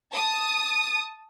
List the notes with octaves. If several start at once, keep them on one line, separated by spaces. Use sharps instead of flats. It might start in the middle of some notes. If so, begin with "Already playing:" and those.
A5 D#6